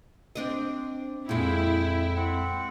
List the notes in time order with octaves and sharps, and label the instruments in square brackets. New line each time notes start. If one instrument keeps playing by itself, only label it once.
[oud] C4 D4 D#5
[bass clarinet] F2 [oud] A#2 G#3 [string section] E4 [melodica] G5
[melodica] C4 F#5